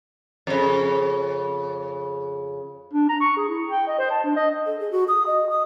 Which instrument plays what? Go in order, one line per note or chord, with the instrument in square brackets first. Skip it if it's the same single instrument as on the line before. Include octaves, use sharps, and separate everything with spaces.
[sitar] F2 C#3
[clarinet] D4
A#5
C#6
G#4
E4
G5
D#5
C5
A5
D4
D#5
[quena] A4
G#4
F#4
D#6
D#5
D#6